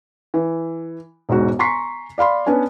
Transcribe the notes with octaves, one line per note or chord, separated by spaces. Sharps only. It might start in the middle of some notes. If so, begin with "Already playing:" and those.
E3
E1 G#2 F#4
G#5 A#5 C6 C#6 B6 C7
D5 F5 B5 C6
B3 C#4 D4 C#5 G#5